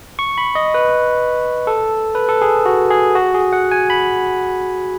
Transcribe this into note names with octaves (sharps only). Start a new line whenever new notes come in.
C#6
B5
D#5
B4
A4
B4
A4
G#4
F#4
G#4
F#4
G#4
F#5
G#5
B5